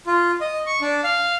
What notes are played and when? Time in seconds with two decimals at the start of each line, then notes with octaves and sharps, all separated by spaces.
0.07 F4
0.41 D#5
0.67 C#6
0.82 D4
1.04 F5